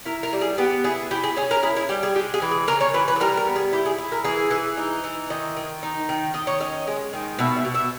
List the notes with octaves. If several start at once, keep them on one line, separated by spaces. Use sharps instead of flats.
E4 A#4
A#4
G3
G#4
B3 G4
E4 G#4
E4 G4
G#4
C#4 G#4
A#4
E4 G#4
E4
G3 G4
G#4
G#3 G4
G#4
E3
G#4
C#3 A#4
C#5
E3 B4
B4
G#4
G3 A#4
A#4
B3
G#4
E4 G4
G#4
E4
A#4
E3 G#4
E3
D#4
E3
D#3 D#5
D#3
D#4
D#3
D#3 D#5
C#5
C#4 D#5
G#3
D#3
B2 E5
E5
B2
E5